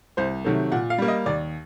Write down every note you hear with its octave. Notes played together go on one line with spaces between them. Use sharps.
C2 C5
C3 D#3 F#3 A3
A#2 F#5
F5
G3 A#3
D#5
D#2 D5